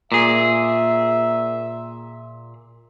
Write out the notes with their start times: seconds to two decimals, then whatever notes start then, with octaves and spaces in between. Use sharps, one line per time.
0.12 A#2 G#4 E5